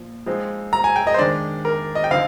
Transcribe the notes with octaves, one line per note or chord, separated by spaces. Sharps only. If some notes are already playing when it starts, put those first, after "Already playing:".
Already playing: A#2 F3
F3 G#3 C4 D#4
A#5
G#5
G5
D#5
C5
D#3 G#3 D4 D5
A#4
D#5
G5
D3 F3 C4 D#4 F5